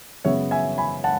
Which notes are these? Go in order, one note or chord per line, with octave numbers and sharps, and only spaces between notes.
F#2 C#3 G#3 B3 C#5 E5
E5 G#5
G#5 B5
F#5 A5